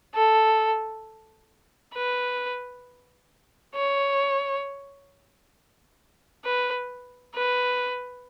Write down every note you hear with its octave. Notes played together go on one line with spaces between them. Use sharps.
A4
B4
C#5
B4
B4